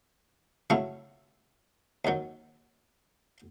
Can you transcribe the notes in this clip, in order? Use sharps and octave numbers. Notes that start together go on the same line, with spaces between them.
C#3 F#3 A3 E4
D#2 D#3 F#3